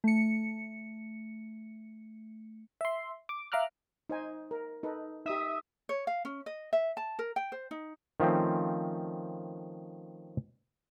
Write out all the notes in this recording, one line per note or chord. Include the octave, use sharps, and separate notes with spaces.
A3 C#7
E5 C6
D6
E5 F5 A#5 D6 F6 F#6
D#4 C5 G#5
A#4
D#4 A4 B4
D#4 G4 E5 D#6
C#5
F5
C#4
D#5
E5
A5
A#4
G5
C5
D#4
D#3 F3 A3 C4 C#4